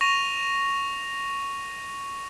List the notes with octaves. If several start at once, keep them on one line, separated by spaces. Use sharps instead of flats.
C#6 A#6 D#7 F7